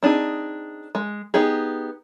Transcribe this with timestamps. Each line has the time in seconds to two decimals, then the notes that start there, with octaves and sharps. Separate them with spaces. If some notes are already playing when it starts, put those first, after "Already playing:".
0.03 C4 D4 D#4 G#4
0.95 G#3
1.34 B3 D#4 G4 G#4